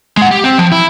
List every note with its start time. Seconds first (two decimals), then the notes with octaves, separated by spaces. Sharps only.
0.17 G#3 F#5
0.31 G4
0.44 C4
0.58 F3
0.72 E4